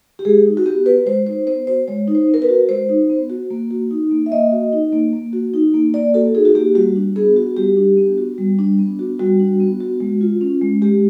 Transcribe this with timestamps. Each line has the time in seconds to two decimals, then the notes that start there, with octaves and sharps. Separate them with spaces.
0.19 G4
0.25 G#3 G#4
0.45 D#4
0.57 F#4
0.66 B3 G4
0.86 F#4 B4
1.06 G#3 C5
1.26 D#4 C5
1.47 B3 C5
1.67 F#4 C5
1.88 G#3 C#5
2.08 D#4
2.15 C5
2.28 B3
2.34 A#4
2.42 B4
2.49 F#4
2.69 G#3 C5
2.89 D#4
3.09 B3
3.30 F#4
3.51 A#3
3.71 F#4
3.91 D#4
4.11 A#3
4.26 E5
4.32 A#3 D#5
4.52 F#4
4.72 D#4
4.92 A#3
5.13 A#3
5.33 F#4
5.54 D#4
5.74 A#3
5.94 A#3 D5
6.14 F#4 A4
6.35 D#4 G#4
6.45 F#4
6.55 A#3 G4
6.75 G3 F#4
6.96 D4
7.16 B3 G#4
7.36 F#4
7.57 G3 G4
7.77 D4
7.97 B3
8.18 F#4
8.38 G3
8.59 D4
8.79 B3
8.99 F#4
9.19 G3 F#4
9.40 D4
9.60 B3
9.80 F#4
10.00 G#3
10.21 F4
10.41 C#4
10.62 G#3
10.82 G#3 G4